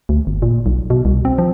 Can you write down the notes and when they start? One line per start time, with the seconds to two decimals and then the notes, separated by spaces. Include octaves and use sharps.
0.09 D2
0.27 G1
0.42 A#2
0.66 B1
0.90 B2
1.05 C2
1.25 C4
1.38 F3